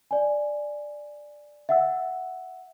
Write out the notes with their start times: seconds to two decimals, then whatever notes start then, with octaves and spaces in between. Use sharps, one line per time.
0.11 D5 G#5
1.69 E5 F#5 E6